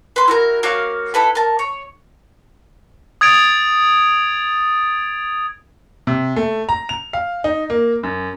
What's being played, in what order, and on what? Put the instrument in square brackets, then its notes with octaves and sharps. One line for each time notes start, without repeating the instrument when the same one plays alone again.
[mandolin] B4 C6
E4 F#4 A#4
A#3 F#4 C#5 F5
E4 A4 B4 B5
A#4 A5
C#5
[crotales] D#6 G#6 A6 D7 F7
[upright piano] C3
A3
A#5
F7
F5
D#4
A#3
F#2